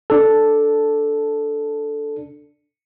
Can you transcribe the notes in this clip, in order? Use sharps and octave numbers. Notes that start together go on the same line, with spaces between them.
D4 A4